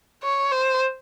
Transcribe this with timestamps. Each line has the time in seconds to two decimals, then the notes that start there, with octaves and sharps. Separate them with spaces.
0.23 C#5
0.52 C5